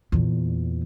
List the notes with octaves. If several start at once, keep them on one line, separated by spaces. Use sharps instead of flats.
E2 A#2